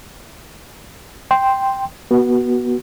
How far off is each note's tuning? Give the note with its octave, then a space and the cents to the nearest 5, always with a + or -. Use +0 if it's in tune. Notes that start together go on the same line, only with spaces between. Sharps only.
G5 +0 C6 +0
B3 -25 F#4 +10